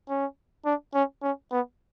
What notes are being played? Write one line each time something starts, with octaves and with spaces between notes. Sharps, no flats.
C#4
D4
C#4
C#4
B3